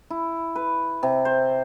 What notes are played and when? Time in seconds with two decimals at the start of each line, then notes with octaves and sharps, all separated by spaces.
0.11 E4
0.56 B4
1.03 C3
1.25 C5